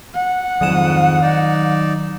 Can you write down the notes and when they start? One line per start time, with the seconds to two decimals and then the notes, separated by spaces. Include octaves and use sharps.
0.14 F#5
0.61 F2 G#2 D#3 F#3 D#6 E7
1.22 D#4 D5